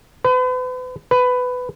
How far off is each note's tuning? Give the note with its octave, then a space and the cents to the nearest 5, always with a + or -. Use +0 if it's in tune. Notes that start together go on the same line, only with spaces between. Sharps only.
B4 +40
B4 +15